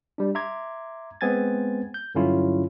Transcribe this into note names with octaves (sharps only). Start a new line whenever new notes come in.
G3 D4
E5 A#5 C6 D6 G#6
G#3 B3 C4 G#5 G#6 A6
G6
G2 D3 F#3 C#4 E4 F4